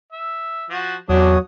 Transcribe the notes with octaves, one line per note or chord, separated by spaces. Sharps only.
E5
F3 F#4
E2 F#3 D4 F#4 G4 C#5 D#6